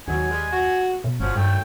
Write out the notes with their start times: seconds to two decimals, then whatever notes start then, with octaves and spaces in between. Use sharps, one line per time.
0.08 D#2 G#2 B2 F#3 G#5
0.30 G3 G#3
0.51 F#4
1.04 B2
1.20 G1 F3 F#3 C#4
1.36 G2 D#3 F#3 A3 G5